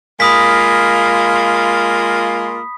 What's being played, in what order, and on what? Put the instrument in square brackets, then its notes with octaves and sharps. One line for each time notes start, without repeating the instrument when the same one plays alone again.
[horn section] G#3 A#3 F4 [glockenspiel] B5 D#6 B6